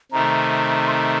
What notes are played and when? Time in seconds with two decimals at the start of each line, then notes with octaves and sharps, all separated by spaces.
0.12 C3 D#3 A3 A#5
0.88 C6
0.93 A#5